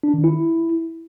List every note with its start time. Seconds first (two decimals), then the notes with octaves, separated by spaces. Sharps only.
0.03 D4
0.14 D#3
0.24 E4